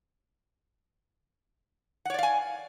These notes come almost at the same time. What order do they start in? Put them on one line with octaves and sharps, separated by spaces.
F#5 C#5 D5 F5 G#5